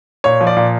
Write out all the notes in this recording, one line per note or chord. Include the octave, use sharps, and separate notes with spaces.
A#2 C#5
F3
D5
A#2